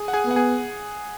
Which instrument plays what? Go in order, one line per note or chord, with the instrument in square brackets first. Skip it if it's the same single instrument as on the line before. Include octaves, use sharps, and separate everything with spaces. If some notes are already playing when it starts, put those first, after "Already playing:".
Already playing: [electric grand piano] G#4 G#5
F#5
G#4 G#5
[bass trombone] B3
[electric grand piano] F#5
G#4 G#5